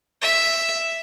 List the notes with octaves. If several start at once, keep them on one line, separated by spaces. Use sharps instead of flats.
E5